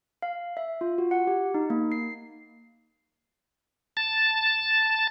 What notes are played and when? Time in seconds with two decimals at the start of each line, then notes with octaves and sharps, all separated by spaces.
0.22 F5
0.57 E5
0.81 F4
0.98 F#4
1.11 F#5
1.27 G4
1.54 D#4
1.70 A#3
1.92 C7
3.97 A5